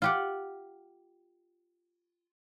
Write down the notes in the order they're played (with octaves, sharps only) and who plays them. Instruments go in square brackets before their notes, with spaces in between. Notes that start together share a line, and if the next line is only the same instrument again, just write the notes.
[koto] F4 G4 F#5